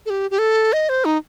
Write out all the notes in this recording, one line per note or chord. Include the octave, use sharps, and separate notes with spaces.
A4
G4
G4
A4
D#5
C5
D#4